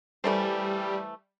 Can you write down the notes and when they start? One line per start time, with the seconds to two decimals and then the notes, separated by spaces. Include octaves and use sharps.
0.24 E3 G3 A3 C5